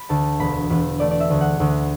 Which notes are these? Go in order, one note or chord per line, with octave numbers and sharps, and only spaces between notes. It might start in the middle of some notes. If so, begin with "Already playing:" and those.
Already playing: B5
D2 A5
E1 B5
E1 B4
A3 D5
D5
E5
D2
F#5
D2